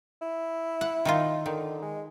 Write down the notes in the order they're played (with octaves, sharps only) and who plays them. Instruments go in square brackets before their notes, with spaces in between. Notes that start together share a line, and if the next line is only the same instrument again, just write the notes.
[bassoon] E4
[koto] F#5
D#3 D#4 F4
[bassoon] D3 [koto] D#3
[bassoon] G#3